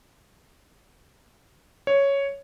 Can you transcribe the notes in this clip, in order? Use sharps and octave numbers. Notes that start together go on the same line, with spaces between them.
C#5